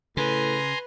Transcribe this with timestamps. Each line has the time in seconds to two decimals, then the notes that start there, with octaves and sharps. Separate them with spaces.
0.17 A2 C#3 B4 G#5 A#5 C6